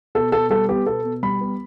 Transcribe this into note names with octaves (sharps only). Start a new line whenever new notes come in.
B2 A4
B2 A4
G3 A4
B3 G4
B2 A4
B2
G3 B5
B3